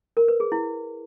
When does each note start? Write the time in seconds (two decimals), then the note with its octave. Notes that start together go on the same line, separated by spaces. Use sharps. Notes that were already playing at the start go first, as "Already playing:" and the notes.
0.17 A#4
0.28 B4
0.40 G#4
0.52 E4